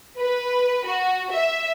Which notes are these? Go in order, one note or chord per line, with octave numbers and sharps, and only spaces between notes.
B4
F#4
E5